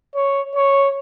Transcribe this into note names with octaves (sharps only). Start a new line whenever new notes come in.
C#5
C#5